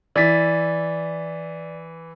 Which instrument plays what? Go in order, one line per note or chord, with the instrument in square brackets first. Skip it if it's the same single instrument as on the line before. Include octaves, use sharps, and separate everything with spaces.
[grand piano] E3 B6 [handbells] D5 A6